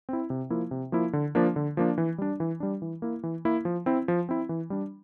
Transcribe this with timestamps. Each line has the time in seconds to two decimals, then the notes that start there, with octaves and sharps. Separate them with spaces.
0.09 C4 E4
0.30 C3
0.50 F3 A#3 E4
0.71 C3
0.92 F3 A#3 E4
1.13 D3
1.35 F3 A#3 D4
1.56 D3
1.77 F3 A#3 D4
1.98 E3
2.18 G3 D4
2.40 E3
2.60 G3 D4
2.82 E3
3.02 A#3 E4
3.23 E3
3.45 A#3 E4
3.65 F3
3.86 C4 E4
4.08 F3
4.29 C4 E4
4.49 E3
4.70 G3 D4